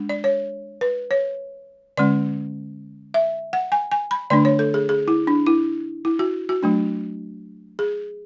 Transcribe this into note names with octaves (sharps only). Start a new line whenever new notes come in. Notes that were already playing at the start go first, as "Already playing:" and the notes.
Already playing: G#3 D4
D5
C#5
B4
C#5
D3 G#3 C#4 D5
E5
F#5
G#5
G#5
B5
D3 A3 D4 D5
C#5
A4
G#4
G#4
E4
D4
E4
E4
F#4
F#4
F#3 A3 D4
G#4